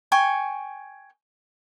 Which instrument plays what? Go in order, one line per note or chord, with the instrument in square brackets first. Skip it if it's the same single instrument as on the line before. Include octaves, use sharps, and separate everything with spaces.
[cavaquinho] G5 G#5 C#6